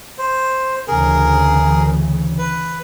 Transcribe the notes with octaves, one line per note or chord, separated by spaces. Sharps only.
C5
D2 C#3 E3 G#4 A#4
B4